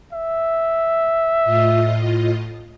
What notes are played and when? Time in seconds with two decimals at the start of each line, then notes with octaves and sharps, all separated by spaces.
0.13 E5
1.44 A2 F4 D#5